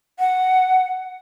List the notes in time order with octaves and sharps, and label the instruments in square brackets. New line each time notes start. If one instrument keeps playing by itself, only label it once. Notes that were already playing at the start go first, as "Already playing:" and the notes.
[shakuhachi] F#5